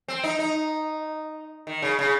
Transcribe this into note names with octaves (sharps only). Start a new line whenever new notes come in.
C4
D#4
D#4
D#3
C#3
C#3